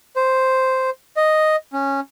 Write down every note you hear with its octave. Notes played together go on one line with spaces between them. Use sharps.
C5
D#5
C#4